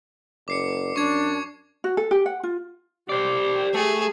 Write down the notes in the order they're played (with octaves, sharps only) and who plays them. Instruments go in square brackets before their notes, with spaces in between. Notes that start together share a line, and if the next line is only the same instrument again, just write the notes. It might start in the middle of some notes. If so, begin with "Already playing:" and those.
[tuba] F#1 [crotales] D6 C7 C#7
[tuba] F#2 [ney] D4 [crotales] C#6 G#6
[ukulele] F#4
A4
G4
F#5
F4
[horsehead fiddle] G4 [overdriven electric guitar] C5 D5
[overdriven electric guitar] A3 [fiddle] G#4